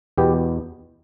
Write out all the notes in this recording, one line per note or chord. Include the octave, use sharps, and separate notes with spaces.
E2 B2 B3 G4